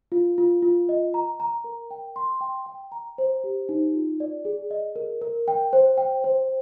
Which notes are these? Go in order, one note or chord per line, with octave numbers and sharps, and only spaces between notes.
F4
F4
F4
D#5
A#5
A#5
A#4
G5
C6
G5
G5
A#5
C5
G4
D#4
F4
D5
G#4
D#5
A#4
A#4
G5
C5
G5
C5